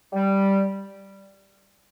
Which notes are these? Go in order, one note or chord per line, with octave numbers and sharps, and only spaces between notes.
G3